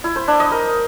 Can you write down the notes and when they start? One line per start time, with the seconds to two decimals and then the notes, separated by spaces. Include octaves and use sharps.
0.04 E4
0.16 C5
0.28 D4
0.40 D#5
0.52 A#4